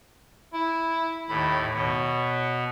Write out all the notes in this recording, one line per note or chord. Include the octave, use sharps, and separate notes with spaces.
E4
D#2 A2 B5
B2 C#5